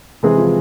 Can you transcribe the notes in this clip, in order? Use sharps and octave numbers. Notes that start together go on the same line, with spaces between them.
C3 E3 G#3 C4 G#4
F3